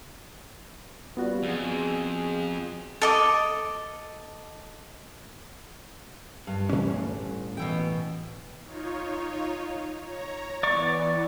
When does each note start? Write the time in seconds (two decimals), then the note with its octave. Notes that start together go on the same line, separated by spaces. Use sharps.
1.17 F#2 G3 B3 F4 F#4
1.43 F2 G#4
3.02 A4 D#5 D6
6.47 G2
6.69 A2 C#4
6.94 G2
7.57 B2 E3 G5
8.65 D#4 F4 C#5
10.01 C#5 A#5
10.63 E3 B3 D5 C#6